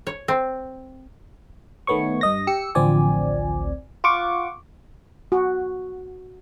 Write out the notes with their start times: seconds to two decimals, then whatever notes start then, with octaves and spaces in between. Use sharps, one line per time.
0.07 C#5
0.28 C4
1.87 D#3 A3 B3 C#5 C#6
2.21 G2 D#5 A#6
2.47 G4 E6 C#7
2.75 A1 D2 F3 C4 D5 G#5
4.04 F4 F#5 C#6 D6
5.32 F#4